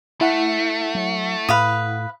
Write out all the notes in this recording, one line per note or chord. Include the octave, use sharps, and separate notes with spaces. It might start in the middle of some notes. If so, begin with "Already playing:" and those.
A3 E4 F#5
F#3
A2 B4 F5 D#6